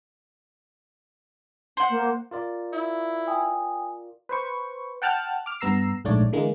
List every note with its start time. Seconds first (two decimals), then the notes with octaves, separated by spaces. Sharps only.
1.77 C5 F#5
1.90 A#3
2.31 F4 A#4 D5
2.73 E4
3.27 G5 G#5 D#6
4.29 B4 C5 C#6
5.02 F#5 G5 A5 F6 F#6 A6
5.46 D6 F6
5.61 G2 B3 A#5 E6 C7
6.05 A#1 G#2 A3 D4 C#5 D5
6.33 D3 E3 G#3 A#3